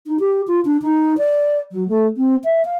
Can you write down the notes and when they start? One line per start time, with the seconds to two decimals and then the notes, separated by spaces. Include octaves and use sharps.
0.06 D#4
0.20 G4
0.48 F4
0.65 D4
0.82 D#4
1.18 D5
1.72 F#3
1.88 A3
2.17 C4
2.44 E5
2.65 F5